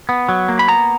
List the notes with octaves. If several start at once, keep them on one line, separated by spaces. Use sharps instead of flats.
B3
F#3
A#3
B5
B3 A#5